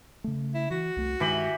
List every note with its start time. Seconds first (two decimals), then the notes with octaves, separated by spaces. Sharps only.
0.24 C#3 A3
0.55 E4
0.71 E3 F#4
0.97 C2 A3
1.20 G2 D#3 E3 G#3 G4 B5